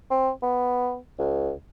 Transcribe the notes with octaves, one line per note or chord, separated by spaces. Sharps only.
C4
B3
C#2